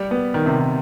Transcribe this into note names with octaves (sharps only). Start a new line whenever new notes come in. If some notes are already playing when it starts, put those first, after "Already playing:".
Already playing: G3
B3
D#3
C3
D#3